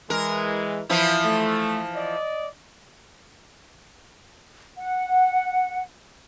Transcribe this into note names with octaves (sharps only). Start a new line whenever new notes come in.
E3 G#3 A#4
E3 F3 E4
A3
D5 D#5
F#5